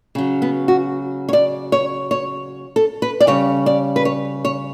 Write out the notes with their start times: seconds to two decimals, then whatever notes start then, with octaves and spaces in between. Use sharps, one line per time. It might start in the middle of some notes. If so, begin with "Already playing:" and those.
0.15 C#3 F#3
0.42 B3
0.68 F#4
1.29 C#5
1.33 D5
1.72 C#5
2.11 C#5
2.76 A4
3.02 B4
3.21 D5
3.27 C#3 G3 C#5
3.66 D5
3.96 B4
4.05 C#5
4.45 C#5